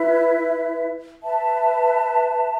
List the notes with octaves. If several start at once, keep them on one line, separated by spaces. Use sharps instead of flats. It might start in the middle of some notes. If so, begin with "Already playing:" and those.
Already playing: E4 B4 E5
B4 E5 A5